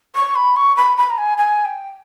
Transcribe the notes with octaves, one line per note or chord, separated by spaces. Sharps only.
C#6
B5
C#6
B5
B5
A#5
G#5
G#5
G5